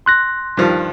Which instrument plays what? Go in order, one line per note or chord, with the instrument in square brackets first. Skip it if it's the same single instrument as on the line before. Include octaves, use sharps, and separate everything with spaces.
[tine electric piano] C6 F#6 A#6
[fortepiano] G2 D#3 F3